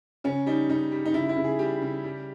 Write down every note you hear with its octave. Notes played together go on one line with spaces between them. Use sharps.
C#3 C#4
G3 D#4
C#3 D#4
G3
D#4
C#3 E4
E4
C#3
G#4
G3 G4
C#3
G3